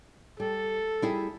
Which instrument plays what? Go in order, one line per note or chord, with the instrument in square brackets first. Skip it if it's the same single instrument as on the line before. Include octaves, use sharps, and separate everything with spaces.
[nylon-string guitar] G3 [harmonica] A4
[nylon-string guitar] G3 E4 G#4